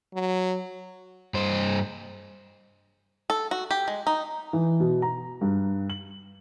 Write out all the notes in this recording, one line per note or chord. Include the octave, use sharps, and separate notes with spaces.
F#3
G2 C5
A4
F#4
G4
G#3
D#4
E3
B2
A#5
G2
F#7